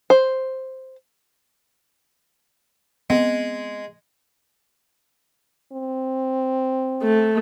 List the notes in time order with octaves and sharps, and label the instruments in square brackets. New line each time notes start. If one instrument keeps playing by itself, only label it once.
[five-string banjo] C5
[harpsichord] G#3 [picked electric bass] B3 C4
[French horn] C4
[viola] A3